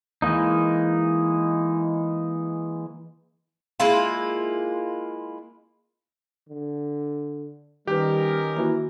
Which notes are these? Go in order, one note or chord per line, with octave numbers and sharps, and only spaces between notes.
E3 G#3 A#3 D#4
G#3 A#3 E4 F4
D3
D#3 G3 C#4 D#4 G4 A#4 B4
E3 A#3 F#4